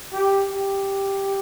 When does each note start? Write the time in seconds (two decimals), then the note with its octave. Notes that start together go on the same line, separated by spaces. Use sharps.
0.13 G4
0.51 G4